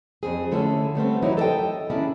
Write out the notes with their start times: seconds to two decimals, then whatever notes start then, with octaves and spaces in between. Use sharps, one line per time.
0.23 F2 G#2 C4 G#4
0.52 D3 A3 C#4 E4 A4
0.95 G3 A3 B3 C4
1.22 E3 F#3 D#4 E4 G4 C#5
1.37 A4 C5 C#5 D#5 G5
1.90 D#3 C#4 D4 E4 G#4